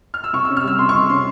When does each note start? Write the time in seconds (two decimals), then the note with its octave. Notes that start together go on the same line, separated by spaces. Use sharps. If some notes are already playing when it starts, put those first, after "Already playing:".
0.14 F6
0.24 E6
0.33 C3 C#6
0.45 C#4 E6
0.57 F6
0.63 G3 E6
0.79 C3 C6
0.89 C#6
0.94 C3 C6
1.09 C#4 C6